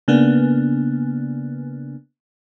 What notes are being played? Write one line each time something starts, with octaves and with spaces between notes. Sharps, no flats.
C#3 A#3 B3 D4